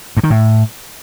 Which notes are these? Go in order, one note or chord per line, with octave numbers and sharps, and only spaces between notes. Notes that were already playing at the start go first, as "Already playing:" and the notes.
G2
D#3
A2